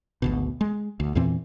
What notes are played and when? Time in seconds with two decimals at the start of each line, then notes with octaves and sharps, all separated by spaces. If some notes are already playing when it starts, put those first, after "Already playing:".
0.22 G#1 D2 B2
0.61 G#3
1.00 D2
1.15 E2 A#2 E3 C4